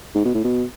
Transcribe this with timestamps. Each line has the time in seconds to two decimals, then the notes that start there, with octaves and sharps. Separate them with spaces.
0.15 G#2
0.25 B2
0.34 A2
0.44 B2